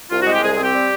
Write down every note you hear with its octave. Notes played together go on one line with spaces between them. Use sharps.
C2 F4
F#4
G#3
G4
C2 G#4
G#4
C4
G4
G3